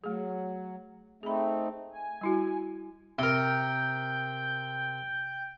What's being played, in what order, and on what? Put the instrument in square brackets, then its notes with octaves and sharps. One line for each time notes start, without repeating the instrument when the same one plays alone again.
[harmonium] F#3 [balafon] A3 G#4
[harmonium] A3 C4 D#4 [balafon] G#4 B5
[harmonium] G#5
[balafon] G3 E4 F#4
[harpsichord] C3 A#4 [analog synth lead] G5